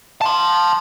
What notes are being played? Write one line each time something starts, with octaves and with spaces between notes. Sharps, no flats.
A5 C6